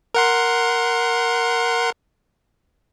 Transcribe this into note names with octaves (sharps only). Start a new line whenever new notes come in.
A#4 F#5 C6